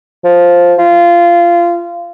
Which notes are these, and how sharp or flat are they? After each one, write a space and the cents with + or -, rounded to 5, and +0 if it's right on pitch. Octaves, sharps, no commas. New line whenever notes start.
F3 +5
F4 -20